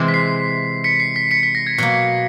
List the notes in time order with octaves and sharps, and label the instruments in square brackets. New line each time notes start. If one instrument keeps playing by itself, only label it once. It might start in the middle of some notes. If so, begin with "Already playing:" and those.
Already playing: [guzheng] C3 E3 G#3 C4
[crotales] B6
C7
B6 C#7
C7
B6
B6 C#7
B6
A#6
G#6
[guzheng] B2 F#3 A#3